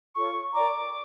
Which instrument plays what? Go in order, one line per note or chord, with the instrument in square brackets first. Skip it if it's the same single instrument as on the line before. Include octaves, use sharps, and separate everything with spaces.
[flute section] F4 A4 C#5 [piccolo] C#6
[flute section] A#4 D5 G5 A#5 [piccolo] D6